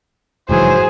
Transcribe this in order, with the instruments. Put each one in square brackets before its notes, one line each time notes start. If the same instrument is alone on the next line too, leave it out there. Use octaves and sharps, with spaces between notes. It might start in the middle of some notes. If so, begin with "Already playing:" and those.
[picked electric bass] F1 G#2 E3 [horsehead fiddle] F#3 G#4 [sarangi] C5